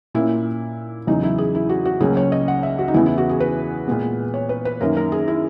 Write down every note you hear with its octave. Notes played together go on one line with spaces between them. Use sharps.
A#2 A#3 C#4 E4
E2 C#3 F#3 D#4
E4
G#4
E4
F#4
F#4
C#2 C#3 F#3 A#3 C#4 G#4
C#5
D#5
F#5
E5
F#4
D#4
E2 C#3 E3 B3 E4
E4
F#4
G#4
B4
A#2 G#3 B3
C#5
B4
B4
F#2 D#3 A#3 C#4 A#4
A#4
G#4
E4